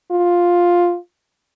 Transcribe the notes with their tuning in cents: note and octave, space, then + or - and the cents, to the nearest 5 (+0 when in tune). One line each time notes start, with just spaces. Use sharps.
F4 +5